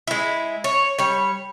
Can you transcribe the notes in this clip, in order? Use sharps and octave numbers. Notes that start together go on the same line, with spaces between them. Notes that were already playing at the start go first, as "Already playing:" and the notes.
G#3 E4
C#5
G3 C#5